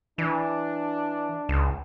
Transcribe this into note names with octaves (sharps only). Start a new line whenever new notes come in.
E3 D4
C#2